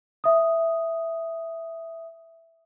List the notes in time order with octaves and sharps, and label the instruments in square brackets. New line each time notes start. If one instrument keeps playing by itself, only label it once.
[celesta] E5 D#6